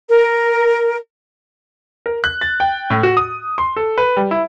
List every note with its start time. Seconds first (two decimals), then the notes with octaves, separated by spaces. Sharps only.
0.09 A#4
2.06 A#4
2.24 F#6
2.41 A6
2.60 G5
2.90 A2
3.03 F#4
3.17 D#6
3.58 C6
3.76 A4
3.98 B4
4.17 G3
4.31 E4